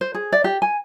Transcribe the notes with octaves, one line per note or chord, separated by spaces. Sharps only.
C5
G#4
D5
G4
G#5